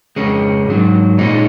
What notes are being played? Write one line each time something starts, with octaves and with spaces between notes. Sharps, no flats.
F2 C#3 G#3 C#4
G#2 D#3 F#3
A#2 G#3 C#4 D#4